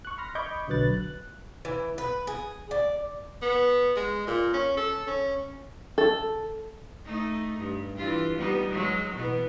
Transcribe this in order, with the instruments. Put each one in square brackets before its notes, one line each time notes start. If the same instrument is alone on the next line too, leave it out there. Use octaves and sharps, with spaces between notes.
[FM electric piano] C#6 F#6
B5 C6 F6 A#6
D#5 B5 C#6 D6 G6 G#6
B1 D3 F#3 B4 F#6 A6
F#6
[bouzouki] E3
B4
G#4
D5
[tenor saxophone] B3
G#3
A#2
C#4
A4
C#4
[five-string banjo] A4
[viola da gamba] A3 D#4
G2
E3 F4 G4
G3 B3 D#4
F#3 G#3
B2 E3 B3